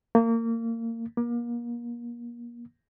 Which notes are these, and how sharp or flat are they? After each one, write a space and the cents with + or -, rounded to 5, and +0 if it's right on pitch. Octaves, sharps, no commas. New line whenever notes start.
A#3 -25
A#3 +35